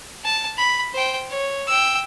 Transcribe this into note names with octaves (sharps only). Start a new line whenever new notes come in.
A5
B5
C5 G5
C#5
G5 E6